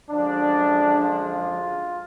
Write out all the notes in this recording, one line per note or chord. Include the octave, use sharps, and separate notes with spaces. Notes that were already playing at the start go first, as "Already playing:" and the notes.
F#2 D3 F3 G#3 D4
F4